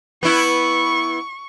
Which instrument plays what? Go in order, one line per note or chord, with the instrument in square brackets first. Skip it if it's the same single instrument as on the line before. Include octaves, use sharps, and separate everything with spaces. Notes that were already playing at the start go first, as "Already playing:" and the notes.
[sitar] B3 E4 [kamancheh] C#6